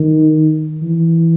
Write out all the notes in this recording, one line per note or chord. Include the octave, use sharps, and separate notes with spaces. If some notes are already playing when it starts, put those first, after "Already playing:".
Already playing: D#3
E3